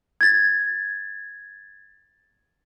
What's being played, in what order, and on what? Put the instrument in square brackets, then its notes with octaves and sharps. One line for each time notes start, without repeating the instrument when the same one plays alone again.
[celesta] G#6 A6